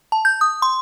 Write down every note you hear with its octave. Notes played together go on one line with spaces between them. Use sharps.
A5
G6
D#6
C6